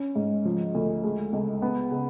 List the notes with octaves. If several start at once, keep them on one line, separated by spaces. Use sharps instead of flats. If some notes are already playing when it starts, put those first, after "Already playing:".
Already playing: C#4
G#2
F3
D2
G#3
C#2
B3
C#3